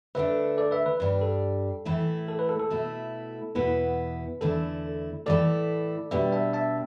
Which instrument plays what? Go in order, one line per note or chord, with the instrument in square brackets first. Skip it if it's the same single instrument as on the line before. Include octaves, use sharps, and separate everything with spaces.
[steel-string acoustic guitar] D2 D3 A3 D4 [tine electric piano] B4 E5
[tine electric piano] A4 D5
B4 E5
B4
[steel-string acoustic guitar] G2 G3 D4 [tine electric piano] B4
[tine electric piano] A4
[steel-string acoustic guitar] A2 E3 A3 E4
[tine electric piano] A4
B4
A4
A4
[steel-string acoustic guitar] B2 A3 E4
[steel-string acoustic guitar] E2 B2 B3 E4 [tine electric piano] B4
[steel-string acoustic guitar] E2 D3 A3 E4 [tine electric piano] A4
[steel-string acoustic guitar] A2 E3 A3 E4 [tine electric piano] A4 D5
[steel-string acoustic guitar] B2 G3 D4 [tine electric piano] B4 E5
[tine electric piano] E5 A5
E5 A5